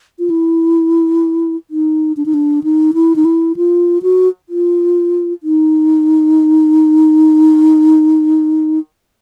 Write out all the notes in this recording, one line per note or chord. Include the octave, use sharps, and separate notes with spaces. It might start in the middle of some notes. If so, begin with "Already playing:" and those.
F4
E4
D#4
D4
D#4
D4
D#4
E4
D#4
E4
F4
F#4
F4
D#4